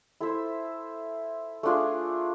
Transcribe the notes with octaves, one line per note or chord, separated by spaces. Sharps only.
E4 A4 C5 E5
A3 D4 F4 G#4